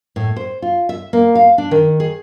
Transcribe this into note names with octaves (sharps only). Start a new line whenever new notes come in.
A2
C5
F4
E5
A#3
F5
D4
D#3
G#4